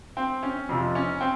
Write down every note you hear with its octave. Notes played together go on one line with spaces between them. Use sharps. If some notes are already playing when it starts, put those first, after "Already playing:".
C4
C#4
F2 C3 F3
C#4
C4